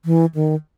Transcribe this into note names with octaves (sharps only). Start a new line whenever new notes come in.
E3
D#3